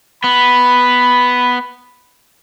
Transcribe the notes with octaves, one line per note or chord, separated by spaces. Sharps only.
B3 B5